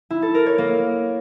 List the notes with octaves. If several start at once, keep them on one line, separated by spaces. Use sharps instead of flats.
E4
A4
A#4
C#5
A#3